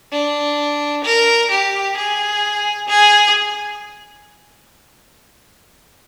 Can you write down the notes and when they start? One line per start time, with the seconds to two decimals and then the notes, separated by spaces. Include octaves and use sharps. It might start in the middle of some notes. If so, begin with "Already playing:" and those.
0.12 D4
1.04 A#4
1.50 G4
1.96 G#4
2.88 G#4